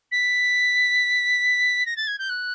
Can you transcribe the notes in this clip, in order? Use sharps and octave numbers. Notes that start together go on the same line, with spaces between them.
B6
A#6
A6
G#6
G6
F#6